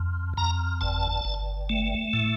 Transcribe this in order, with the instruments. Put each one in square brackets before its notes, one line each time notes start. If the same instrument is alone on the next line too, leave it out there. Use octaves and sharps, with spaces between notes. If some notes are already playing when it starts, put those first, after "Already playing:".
Already playing: [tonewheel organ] F2
F2 A#5
G1 A5
G1
A3
A2